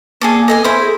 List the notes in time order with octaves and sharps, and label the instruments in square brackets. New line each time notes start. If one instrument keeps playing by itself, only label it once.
[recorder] A#3 [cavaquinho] G#4 A4 D5
[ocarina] A4 [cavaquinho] D#5 E5 G#5
[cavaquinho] E4 C5 B5 [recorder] E5
[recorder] G#4 [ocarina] A4